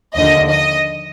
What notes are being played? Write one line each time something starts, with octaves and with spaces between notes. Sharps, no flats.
D#2 D3 F3 D#5
D#5